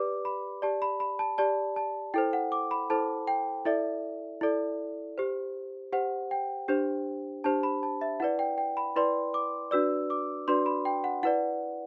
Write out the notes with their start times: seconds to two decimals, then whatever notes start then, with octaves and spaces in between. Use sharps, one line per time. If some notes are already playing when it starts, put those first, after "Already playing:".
Already playing: G4 B4 D5 D6
0.25 B5
0.62 G4 D5 A5
0.82 B5
1.00 B5
1.19 A5
1.38 G4 D5 A5
1.76 A5
2.14 E4 A4 C5 G5
2.33 F#5
2.52 D6
2.71 B5
2.90 E4 A4 C5 A5
3.27 G5
3.65 E4 A4 D5 E5
4.41 E4 A4 D5
5.18 G4 C5
5.93 G4 C5 F#5
6.31 G5
6.68 D4 G4 C5
7.44 D4 G4 C5 A5
7.63 B5
7.83 A5
8.01 E5
8.20 E4 B4 D5 F#5
8.39 G5
8.58 G5
8.77 B5
8.96 E4 B4 D5 C6
9.34 D6
9.71 D4 F#4 B4 D5 E6
10.10 D6
10.48 D4 F#4 B4 D5 C6
10.66 B5
10.85 G5
11.04 F#5
11.23 E4 B4 D5 F#5